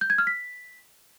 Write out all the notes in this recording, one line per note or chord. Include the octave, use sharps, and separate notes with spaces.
G6
G#6
F6
B6